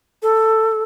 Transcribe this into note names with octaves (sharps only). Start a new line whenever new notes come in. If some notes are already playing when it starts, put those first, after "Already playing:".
A4